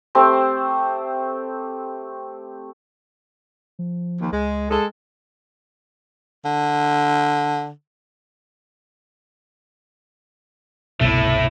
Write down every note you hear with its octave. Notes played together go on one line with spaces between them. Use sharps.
A3 C4 G4
F3
D#2
C#2 G#3
G#3 A4
D3
G1 C2 B2 A3 E4